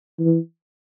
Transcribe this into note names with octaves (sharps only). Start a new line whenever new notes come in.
E3